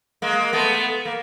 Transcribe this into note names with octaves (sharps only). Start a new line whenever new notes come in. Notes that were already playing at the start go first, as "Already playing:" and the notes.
G#3 A#3
A3 B3
A#3